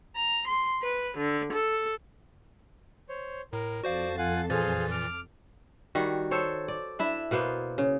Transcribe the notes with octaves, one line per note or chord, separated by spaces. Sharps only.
A#5
C6
B4
D3
A4
C5 C#5
A2 A#4
F2 F#4 A4 C5 D5 F5
F4 F5 F#5 G#5
A#2 E3 G#4 C5 F5 A6
D6 F6
D#3 G3 F#4
A4 C5 C#5
D5
D4 E4 E5
B2 A#3 B3 C5
C#3